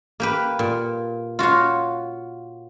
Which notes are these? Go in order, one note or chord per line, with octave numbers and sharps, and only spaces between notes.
A#3 G4 B4
A#2
F4 F#4 C#5 F5